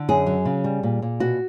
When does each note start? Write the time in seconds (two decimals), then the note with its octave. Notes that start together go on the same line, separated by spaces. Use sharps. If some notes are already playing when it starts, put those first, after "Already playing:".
Already playing: D3
0.09 F#2 G#4
0.26 F#3
0.45 C#3
0.64 G3
0.83 A#2
1.02 A#2
1.20 B2 F#4